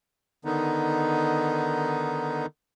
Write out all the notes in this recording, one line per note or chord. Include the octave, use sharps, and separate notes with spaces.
D3 D#3 B3 D#4